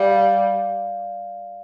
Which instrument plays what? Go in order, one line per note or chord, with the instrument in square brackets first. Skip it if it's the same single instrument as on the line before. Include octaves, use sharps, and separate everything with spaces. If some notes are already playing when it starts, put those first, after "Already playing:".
Already playing: [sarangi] G3 [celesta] D5 F5
[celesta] F5
D5